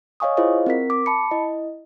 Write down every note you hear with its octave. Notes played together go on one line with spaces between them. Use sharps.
C#5 D#5 F5 G#5 C#6 D#6
E4 F4 G#4 C5 D#5 F5
C4 A#4 B6
D6
A5 B5 C#7
E4 D#5